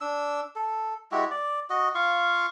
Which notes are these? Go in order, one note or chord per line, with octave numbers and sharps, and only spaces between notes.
D4 E6
A4
G#3 E4 F#4 G4
D5
F#4 D#5
F4 F5 C#6